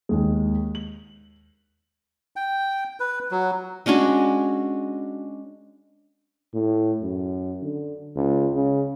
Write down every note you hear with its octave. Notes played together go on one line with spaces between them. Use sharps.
D#2 G#3
F#7
G5
B4
F#3
G#3 C#4 D4 F#4
A2
F#2
D3
C#2
C#3